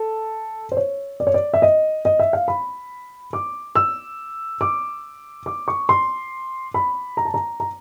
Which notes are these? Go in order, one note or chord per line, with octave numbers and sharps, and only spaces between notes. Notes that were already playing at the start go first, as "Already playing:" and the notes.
Already playing: A4
C5
C#5
D5
C#5
D5
E5
D#5
D#5
E5
F5
B5
D6
E6
D6
D6
C#6
C6
B5
A#5
A5
A#5
A#5